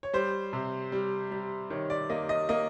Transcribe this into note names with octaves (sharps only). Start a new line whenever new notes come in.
C#5
G3 C5
C3
G3
G3
D#3 C#5
D5
A#3 D#5
D#5
A#3 D#5